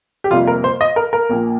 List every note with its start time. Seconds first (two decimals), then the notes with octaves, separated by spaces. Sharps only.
0.24 G4
0.31 F2 C3 G3 A#3 F4
0.47 A#4
0.64 C5
0.81 D#5
0.96 A#4
1.13 A#4
1.29 A#1 A#2 A#3